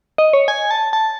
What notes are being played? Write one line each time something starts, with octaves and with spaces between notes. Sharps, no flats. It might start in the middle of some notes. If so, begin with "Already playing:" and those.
D#5
C#5
G#5
A5
A5